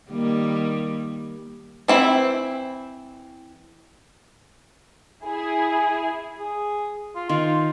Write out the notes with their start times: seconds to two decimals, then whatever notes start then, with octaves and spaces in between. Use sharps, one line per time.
0.10 D#3 G3 A#3
1.88 E3 C4 E4
5.24 E4 G#4
6.39 G#4
7.15 F4
7.29 D#3 F4